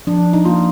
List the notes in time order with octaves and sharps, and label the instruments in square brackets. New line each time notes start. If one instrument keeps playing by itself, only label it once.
[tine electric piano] F3 [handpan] D4
[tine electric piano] D4
[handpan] D#4
[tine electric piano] A#3 [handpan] F4